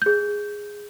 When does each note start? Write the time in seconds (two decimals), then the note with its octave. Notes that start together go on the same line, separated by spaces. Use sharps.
0.02 G#4 G6